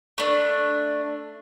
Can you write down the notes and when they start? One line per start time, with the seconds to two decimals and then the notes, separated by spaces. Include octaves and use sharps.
0.18 A3 D4